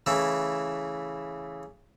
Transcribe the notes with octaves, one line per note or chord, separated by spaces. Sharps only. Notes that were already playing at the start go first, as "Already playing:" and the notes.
C#3 E3 A3 E4